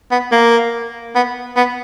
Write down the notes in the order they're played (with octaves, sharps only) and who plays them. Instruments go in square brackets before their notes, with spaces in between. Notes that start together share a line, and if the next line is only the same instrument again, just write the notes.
[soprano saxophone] B3
A#3
B3
B3